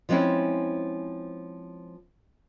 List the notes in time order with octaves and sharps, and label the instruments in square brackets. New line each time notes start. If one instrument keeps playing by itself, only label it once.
[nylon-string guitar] F3 G#3 C4 C#4 E4